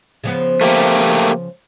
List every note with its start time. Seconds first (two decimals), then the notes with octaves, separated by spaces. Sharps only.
0.24 C#3 F3 B3
0.61 A3 A#3 G4